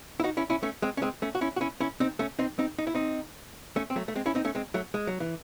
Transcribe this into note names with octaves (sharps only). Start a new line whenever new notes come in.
E4
D#4 F#4
C#4 E4
C#4 E4
A3 C#4
G#3 C4
C#4
G#3 C4
A3 C#4
F#4
C#4 E4
F#4
C#4 E4
C#4 E4
C4 D#4
A3 C#4
C4 D#4
C4 D#4
D#4
E4
C4 D#4
A3 C#4
C4
F#3 A3
A3
G#3 C4
C#4 E4
C4 D#4
A3 C#4
G#3 C4
F#3 A3
G#3
F#3
E3